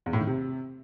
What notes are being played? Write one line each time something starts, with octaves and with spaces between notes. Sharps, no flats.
E2
A2
D#3
C3